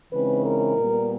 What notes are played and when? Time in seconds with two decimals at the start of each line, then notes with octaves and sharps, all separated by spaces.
0.12 C#3 E3 G#3 C4 D#4 B4
0.44 A#4
0.76 A#2 G3 B3